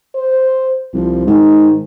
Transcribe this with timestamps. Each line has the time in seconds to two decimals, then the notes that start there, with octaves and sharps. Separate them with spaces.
0.15 C5
0.94 C2 F3
1.27 G#2 D#3